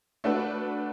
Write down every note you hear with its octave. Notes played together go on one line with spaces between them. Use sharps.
A3 D4 F#4 B4